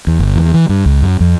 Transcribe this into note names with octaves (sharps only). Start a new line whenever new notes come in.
E2
G1
E2
E3
G2
C#2
F#2
F2